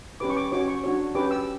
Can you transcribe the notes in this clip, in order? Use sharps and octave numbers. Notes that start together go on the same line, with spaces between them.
C#4 G4 B4 D6
C#6
D6
C#4 F#4 C#5 D6
C#6
D4 F#4 C#5
C#4 G4 B4 D6
E6